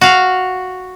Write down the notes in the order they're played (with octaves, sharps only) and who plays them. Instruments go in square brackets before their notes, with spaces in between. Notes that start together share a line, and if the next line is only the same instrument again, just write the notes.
[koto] F#4 F5